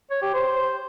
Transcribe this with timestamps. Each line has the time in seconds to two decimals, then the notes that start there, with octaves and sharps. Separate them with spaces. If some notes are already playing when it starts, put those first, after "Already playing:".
0.11 C#5
0.22 G4
0.34 C5